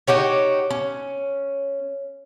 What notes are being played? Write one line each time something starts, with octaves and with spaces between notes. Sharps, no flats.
D#4 F#4 G4 C#5
C#4